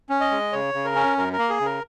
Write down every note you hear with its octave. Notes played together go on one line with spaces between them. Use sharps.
C#4
D#5
G#3
C#3 C#5
C#3
A#4
C#4
F#2 A#4
A#4
A#3
G#4
C#3
A#4